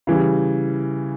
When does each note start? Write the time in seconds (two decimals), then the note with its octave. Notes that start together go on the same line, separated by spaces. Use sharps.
0.07 C#3 E3 G3